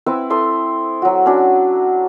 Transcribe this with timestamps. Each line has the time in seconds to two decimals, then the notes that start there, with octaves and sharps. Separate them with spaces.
0.06 C4 E4 B4 E5
0.30 E4 A4 C6 D#6
1.02 F#3 F#4
1.26 C#4 D4 F#4